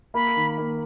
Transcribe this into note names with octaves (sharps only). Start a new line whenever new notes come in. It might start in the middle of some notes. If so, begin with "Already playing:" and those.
A#3 B5
D#3
A#3